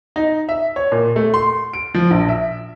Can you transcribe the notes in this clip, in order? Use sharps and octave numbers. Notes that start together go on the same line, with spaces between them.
D#4
E5
C#5
A#2
A3
C6
D7
F3
A#1
E5